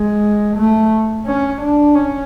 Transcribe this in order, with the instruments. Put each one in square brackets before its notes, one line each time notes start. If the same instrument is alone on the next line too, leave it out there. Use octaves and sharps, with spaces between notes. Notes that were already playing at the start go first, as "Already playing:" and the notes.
Already playing: [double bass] G#3
A3
C#4
D4
C#4